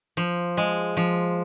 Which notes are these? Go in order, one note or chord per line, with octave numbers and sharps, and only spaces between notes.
F3
G#3
F3